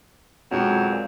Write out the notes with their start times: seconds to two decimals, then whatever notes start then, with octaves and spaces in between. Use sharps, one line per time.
0.51 F2 B2 F#3 G#3 C4
0.92 A#2